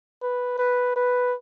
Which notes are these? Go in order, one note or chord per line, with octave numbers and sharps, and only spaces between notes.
B4
B4
B4